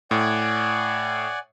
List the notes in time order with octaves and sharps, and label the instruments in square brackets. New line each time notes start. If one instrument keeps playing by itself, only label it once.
[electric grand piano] A2 [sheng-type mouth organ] D5 F#5 G#5